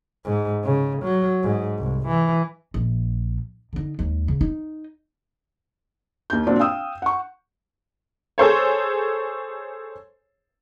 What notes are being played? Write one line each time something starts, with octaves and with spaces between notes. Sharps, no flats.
G#2
C#3
F#3
G#2
C2
E3
A#1
D3 D#4
D#2 G#3
C#3
D#4
D#2 G6
A#2 F#3 C4 D4
F5 G5 D#6 E6
F#5 C#6
G#4 A4 C5 C#5